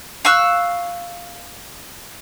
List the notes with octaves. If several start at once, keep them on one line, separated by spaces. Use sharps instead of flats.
F5 C#6 E6 F#6